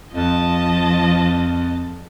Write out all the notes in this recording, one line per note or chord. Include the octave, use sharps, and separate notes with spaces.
F2 F3 D#5 A5